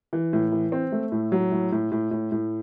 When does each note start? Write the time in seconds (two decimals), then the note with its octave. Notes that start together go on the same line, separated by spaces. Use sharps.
0.13 E3
0.33 A2
0.52 E3
0.72 C4
0.92 A3
1.12 A2
1.32 F#3
1.52 A2
1.72 A2
1.92 A2
2.11 A2
2.32 A2